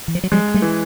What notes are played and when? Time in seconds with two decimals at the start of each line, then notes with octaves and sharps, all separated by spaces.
0.08 E3
0.15 F3
0.24 F#3
0.32 F3 G3 G#3
0.54 G3 A3
0.62 E3